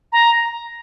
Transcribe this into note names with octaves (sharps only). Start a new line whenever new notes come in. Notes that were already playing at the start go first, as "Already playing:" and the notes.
A#5